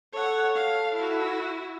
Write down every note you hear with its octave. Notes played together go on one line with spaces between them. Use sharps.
A4 C#5 F#5
F5
E4 F#4